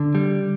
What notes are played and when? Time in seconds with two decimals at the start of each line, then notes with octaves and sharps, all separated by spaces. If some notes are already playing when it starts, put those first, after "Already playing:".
Already playing: D3
0.15 G3